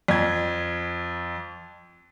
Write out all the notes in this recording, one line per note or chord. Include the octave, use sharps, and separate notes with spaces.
F2 G#6